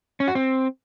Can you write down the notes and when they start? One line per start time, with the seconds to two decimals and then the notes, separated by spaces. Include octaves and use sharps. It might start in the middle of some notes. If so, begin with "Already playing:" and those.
0.20 C#4
0.28 F#4
0.35 C4